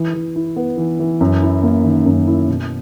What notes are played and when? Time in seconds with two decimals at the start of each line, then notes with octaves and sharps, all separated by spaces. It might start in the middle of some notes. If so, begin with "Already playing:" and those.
Already playing: E3
0.14 E3
0.36 E4
0.56 B3
0.77 E3
1.00 E3
1.21 F#2
1.42 E4
1.63 A#3
1.84 D#3
2.06 F#2
2.28 E4
2.48 B2